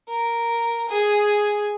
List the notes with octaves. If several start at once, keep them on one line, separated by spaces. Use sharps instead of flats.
A#4
G#4